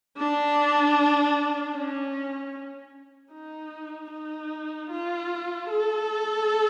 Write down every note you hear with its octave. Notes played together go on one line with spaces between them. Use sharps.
D4
C#4
D#4
D#4
F4
A4